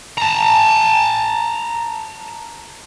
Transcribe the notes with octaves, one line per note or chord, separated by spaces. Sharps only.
A5 A#5